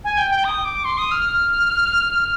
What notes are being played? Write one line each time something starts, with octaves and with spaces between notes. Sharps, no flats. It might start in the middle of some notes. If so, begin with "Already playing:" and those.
G#5
G5
G5
D#6
D6
C6
D#6
F6
F6